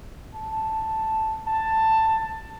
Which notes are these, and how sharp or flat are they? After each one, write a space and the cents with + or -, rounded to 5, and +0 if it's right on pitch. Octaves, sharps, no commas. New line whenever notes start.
A5 +0
A5 +10